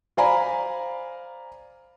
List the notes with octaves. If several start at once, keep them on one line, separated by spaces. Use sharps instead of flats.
C5 D5 F5 G#5 A#5 B5